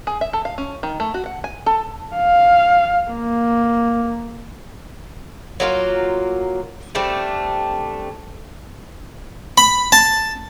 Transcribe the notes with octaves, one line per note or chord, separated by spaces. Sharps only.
G#4
E5
A4
F5
C#4
D#3
A3
F#4
F#5
G#5
A4
F5
A#3
F#3 A#3 D#4 F4
G3 A3 C4 D4
B5
A5